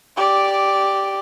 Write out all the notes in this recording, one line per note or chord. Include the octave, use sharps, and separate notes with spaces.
G4 D5